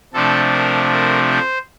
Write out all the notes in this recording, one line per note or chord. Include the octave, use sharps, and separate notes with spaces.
C3 F3 A3 D4 A4
A#4
A#4
C5